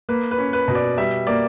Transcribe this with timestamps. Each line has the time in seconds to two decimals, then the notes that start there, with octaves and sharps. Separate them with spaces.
0.09 A#3 B4
0.31 B4
0.38 C#4
0.53 B4
0.68 B2
0.75 D5
0.98 G3 E5
1.27 A#3 D5